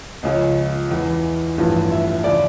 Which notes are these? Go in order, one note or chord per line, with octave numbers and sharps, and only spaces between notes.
C#2 C#3 F3 C#5
E2 E3
A1 G2 F3
E5
C#3 F3 D5